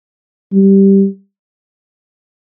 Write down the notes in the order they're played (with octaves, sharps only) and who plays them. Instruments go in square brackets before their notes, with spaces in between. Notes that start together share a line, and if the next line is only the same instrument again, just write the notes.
[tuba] G3